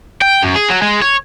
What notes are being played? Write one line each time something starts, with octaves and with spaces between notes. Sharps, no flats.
G5
F#2
G#4
F#3
G#3
C#5